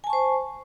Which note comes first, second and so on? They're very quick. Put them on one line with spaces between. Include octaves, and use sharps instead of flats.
G#5 A5 C#6 C5